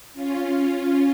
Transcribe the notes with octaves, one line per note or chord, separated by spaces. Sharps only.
C#4 F4